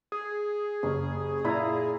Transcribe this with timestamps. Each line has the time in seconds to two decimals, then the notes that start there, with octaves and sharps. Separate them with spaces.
0.12 G#4
0.83 F#1 C#3 C#4 G4
1.45 A#2 E4 D5 A#5 B6